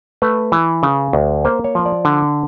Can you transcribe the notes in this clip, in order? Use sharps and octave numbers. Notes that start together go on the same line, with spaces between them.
A3 B4
E3
C#3
D2
A#3 C5
C#5
F3
D5
D3